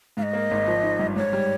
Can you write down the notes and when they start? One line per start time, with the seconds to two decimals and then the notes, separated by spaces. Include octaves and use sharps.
0.17 G#2 F5
0.23 D#5
0.33 A#3
0.51 G#1
0.67 F3
0.83 D#4
0.99 G2
1.16 G#2 C#5
1.33 G3